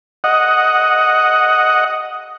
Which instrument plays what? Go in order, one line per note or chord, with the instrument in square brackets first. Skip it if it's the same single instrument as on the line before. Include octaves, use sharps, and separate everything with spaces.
[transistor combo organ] D#5 F#5